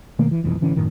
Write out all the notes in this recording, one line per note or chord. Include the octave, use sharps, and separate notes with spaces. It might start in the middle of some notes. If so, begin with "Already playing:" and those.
B2 D#3 A3 A#3
E3
F1 B1 F2 E3
A1 D3 E3 C#4
F#2 A2 D#3